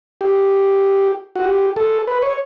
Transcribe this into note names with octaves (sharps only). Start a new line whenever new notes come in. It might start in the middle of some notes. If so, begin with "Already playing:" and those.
G4
F#4
G4
A4
B4
C#5